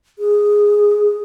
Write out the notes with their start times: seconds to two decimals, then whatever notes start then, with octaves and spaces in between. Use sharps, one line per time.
0.19 G#4